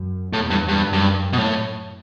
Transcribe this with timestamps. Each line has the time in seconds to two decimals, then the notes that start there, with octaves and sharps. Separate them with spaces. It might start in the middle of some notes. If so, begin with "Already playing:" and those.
Already playing: F#2
0.32 E2 A2
0.50 G2
0.68 G2
0.86 F#2
0.93 G2
1.33 B2
1.38 A2